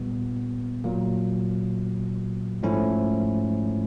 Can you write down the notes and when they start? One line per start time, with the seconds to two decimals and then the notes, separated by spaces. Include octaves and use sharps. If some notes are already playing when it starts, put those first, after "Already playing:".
Already playing: A#2 G3 B3
0.84 A#2 F#3 A#3
2.63 G#2 F3 A3 C#4 E4